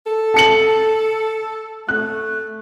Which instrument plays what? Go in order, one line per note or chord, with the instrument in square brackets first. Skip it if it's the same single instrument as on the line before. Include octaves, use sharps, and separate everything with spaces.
[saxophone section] A4
[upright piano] A5 C#7 F#7
[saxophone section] A3 [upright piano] F#6